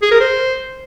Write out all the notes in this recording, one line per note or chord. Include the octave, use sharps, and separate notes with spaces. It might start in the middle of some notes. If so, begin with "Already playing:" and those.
G#4
A#4
C5